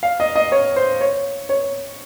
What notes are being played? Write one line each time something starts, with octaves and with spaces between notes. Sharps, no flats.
F5
D#5
D#5
C#5
C5
C#5
C#5